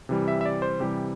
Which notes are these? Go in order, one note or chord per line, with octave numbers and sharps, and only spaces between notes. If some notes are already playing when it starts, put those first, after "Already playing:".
C3 E3 G3
E5
E5
D5
C5
C3 E3 G3 G4